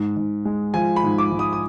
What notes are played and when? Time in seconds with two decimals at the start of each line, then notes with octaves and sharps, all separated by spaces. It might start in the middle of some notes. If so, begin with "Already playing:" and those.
Already playing: G#2
0.17 G#2
0.45 G#3
0.74 F3 G#5
0.96 B5
1.04 G#2
1.18 D6
1.32 G#2
1.39 D#6
1.53 D#6